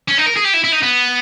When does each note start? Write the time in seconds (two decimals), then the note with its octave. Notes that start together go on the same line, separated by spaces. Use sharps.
0.09 C#4
0.18 D#4
0.27 A#4
0.37 G#4
0.45 G4
0.54 E4
0.64 E4
0.73 D#4
0.83 B3